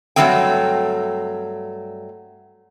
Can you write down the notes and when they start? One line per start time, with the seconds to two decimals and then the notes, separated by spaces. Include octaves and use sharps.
0.16 G2 F#3 G3 A3 C4 G5